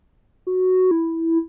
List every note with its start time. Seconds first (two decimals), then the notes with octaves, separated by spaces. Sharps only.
0.47 F#4
0.91 E4